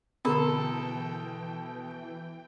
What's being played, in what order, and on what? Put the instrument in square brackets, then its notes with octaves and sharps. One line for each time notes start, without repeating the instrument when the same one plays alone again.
[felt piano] B2 C6 [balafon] D3 G#4 B5 [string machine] E3 G5 [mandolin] A4